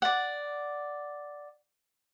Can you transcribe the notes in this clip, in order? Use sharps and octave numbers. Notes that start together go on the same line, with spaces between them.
D5 F#5